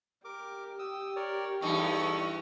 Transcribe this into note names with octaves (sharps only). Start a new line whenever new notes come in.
G4 A#4 D6
G4 D#6 E6
A#4 C#5 D5
E2 G2 D#4 A4 D#5 C#6 E6